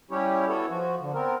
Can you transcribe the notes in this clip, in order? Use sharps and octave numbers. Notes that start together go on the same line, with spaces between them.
G3 C#4 E4 G4 C#5
B3 E4 F#4 A4 C#5
F3 F#4
D3
B3 C4 A#4